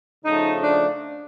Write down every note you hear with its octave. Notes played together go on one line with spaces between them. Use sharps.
C#3 F3 A3 D#4
D4